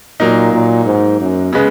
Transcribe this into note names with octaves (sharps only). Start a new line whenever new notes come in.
A#2 F#3 A#3 D#4
A#2
G#2
F#2
C#3 G#3 B3